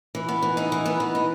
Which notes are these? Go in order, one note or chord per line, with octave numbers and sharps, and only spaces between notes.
E3
B3
E3
D#4
E3
B3
E3
D#4